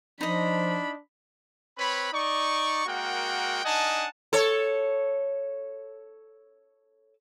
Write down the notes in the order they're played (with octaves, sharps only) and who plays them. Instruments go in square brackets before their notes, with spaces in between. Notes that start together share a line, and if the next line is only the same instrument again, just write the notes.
[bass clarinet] F3 [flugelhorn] D4 [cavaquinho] D#4 D#5 [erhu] B5
[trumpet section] C4 B4 C#5 B5
D#4 D5 C#6
G#3 A#3 F#4 A#4 F#5 G5
D4 D#4 D#5 F#5 G#5 A5
[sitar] A4 C#5